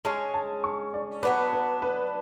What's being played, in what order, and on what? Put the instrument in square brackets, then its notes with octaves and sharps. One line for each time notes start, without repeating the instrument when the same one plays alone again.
[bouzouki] G#3 C#4 G#4 C#5 [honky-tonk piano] A5
[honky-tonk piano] A5
C#6
D5
[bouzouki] F#3 B3 D4 [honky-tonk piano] B4
[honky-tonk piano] B4
B4